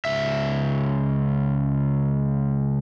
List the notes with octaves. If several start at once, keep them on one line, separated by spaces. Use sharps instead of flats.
C#2 E5